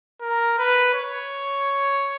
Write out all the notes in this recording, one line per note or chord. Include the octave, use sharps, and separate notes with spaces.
A#4
B4
C#5